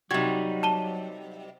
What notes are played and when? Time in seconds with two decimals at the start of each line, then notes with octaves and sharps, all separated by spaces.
0.11 C3 F#3 G3 D#4 F#4 G#6
0.63 A5 D#7 G7